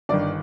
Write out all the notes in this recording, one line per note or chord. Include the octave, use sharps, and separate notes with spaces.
G1 G2 D#3 D5